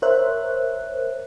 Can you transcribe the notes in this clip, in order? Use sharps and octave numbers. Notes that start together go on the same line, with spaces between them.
A#4 C5 C#5 E5 F#6